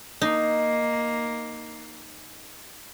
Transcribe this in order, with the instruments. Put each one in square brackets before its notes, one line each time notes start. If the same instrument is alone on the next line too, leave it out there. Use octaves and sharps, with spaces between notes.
[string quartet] A#3 [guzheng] D#4